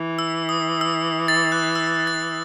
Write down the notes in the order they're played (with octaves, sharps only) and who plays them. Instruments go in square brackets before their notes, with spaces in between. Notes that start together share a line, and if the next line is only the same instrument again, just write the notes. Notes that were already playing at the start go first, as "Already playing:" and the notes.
Already playing: [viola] E3
[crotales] E6
D#6
E6
A6
F#6
E6
A6